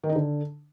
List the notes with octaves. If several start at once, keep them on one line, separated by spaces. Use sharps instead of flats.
D#3
D#4
D3